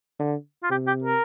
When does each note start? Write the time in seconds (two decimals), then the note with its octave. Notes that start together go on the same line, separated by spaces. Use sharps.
0.19 D3
0.63 F4
0.70 C3 G4
0.87 G4
1.04 A#4